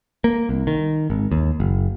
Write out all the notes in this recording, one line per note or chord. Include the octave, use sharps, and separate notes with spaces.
A#3
C2
D#3
G#1
D#2
F#1